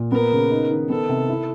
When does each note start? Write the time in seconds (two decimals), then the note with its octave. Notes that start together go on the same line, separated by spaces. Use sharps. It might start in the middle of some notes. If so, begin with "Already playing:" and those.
Already playing: A#2
0.12 B3 A#4
0.32 C#3
0.51 D#4
0.70 D#3
0.90 B3 A4
1.09 C3
1.29 E4